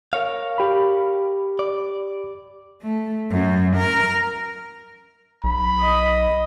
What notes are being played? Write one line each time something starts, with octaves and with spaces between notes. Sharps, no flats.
A#4 C#5 F5
G4 B5
D5
A3
F#2
A#4
B1 B5
D#5